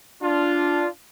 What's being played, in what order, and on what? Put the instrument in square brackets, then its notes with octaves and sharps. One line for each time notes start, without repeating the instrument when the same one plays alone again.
[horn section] D4 F4